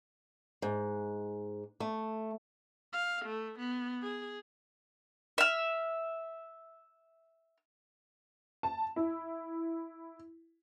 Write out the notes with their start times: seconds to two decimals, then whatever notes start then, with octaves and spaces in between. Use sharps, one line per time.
0.62 G#2
1.80 A3
2.93 F5
3.25 A3
3.59 B3
4.02 G#4
5.38 E5 F6
8.63 A5
8.96 E4